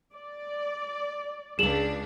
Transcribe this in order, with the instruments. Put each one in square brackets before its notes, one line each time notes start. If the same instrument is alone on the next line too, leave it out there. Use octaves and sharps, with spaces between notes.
[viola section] D5
[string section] C#2 D4 [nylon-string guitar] G#4 A4 D5 [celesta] E7 F#7